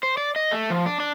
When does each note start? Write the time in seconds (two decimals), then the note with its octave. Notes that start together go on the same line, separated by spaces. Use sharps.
0.03 C5
0.17 D5
0.36 D#5
0.51 A3
0.70 F3
0.86 D4
1.00 D4